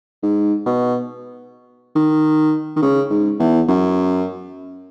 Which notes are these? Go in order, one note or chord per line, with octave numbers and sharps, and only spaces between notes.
G#2
B2
D#3
D#3
C#3
G#2
E2
F#2